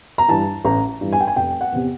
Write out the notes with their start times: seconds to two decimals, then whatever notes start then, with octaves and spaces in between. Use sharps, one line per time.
0.18 A#5
0.28 G2 E3 A5
0.65 A1 A#5
1.01 G2 E3
1.13 G#5
1.20 G5
1.27 G#5
1.36 F1 G5
1.61 F#5
1.72 E2 C3